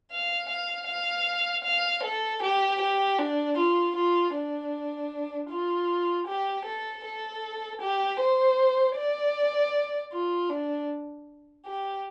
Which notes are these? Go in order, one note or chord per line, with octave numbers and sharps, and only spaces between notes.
F5
F5
F5
F5
A4
G4
G4
D4
F4
F4
D4
F4
G4
A4
A4
G4
C5
D5
F4
D4
G4